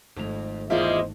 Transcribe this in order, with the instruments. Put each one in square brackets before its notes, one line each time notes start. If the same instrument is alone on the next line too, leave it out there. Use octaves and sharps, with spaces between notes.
[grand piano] G#1 A3 F7 [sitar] F2
[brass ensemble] E2 C5 D#5 [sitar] G3 G#3 A#3 [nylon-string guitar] F4 E5